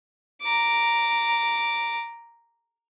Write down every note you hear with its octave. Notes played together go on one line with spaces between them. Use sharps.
A#5 D6